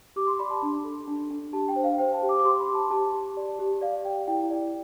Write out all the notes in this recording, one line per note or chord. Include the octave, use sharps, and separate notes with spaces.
G4 D6
C6
D5 B5
A5
D4
A4
D4
D4
G4 A5
G5
C5
F5
C5 G5
A5
G4
D6
D6
G4 C6
B5
G4
A5
G4 A5
G4
D5
G4
D5 F5
D5 G5
E4 G5
D5